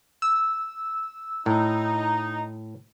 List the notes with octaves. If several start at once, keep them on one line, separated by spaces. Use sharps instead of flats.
E6
A2 D#4